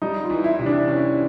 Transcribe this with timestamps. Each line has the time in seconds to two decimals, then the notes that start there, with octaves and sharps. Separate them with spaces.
0.02 G3 D#4
0.24 F4
0.30 E3
0.44 E4
0.59 C3
0.66 D4
0.88 E3 C#4